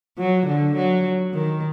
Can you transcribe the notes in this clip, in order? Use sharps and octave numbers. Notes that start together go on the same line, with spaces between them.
F#3
D3
F#3
D#3